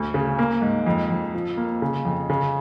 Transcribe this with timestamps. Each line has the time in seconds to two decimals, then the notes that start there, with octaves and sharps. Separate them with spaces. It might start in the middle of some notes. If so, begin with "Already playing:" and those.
Already playing: D2
0.14 C#3
0.39 A#3
0.62 G#2
0.86 F2
1.10 F2
1.34 F3
1.57 A#3
1.82 C#3
2.05 F2
2.29 C#3